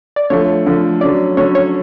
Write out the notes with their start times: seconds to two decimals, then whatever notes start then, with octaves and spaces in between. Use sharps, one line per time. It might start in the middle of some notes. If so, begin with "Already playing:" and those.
0.16 D5
0.30 D3 F3 A3 C#5
0.66 D3 F3 A3
1.01 D3 F#3 C#4 D5
1.37 D3 F#3 C#4 C#5
1.55 C#5